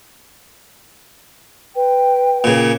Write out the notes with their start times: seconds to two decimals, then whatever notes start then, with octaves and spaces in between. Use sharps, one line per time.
1.76 B4 G5
2.44 A#2 C#3